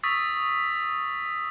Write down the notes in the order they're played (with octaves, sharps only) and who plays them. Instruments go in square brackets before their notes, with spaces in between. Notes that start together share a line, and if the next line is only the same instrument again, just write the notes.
[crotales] C#6 D#6 E6 A6 B6